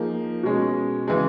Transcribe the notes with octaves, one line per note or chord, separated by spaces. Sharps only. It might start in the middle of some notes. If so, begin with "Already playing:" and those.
Already playing: F3 A#3 D#4 G#4
B2 G#3 C#4
C#3 E3 G#3